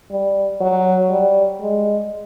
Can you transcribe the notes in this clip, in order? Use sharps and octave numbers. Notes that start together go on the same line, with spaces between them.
G3
F#3
G3
G#3